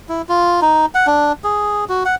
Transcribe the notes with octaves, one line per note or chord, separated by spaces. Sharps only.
E4
F4
D#4
F#5
D4
G#4
F#4
F#5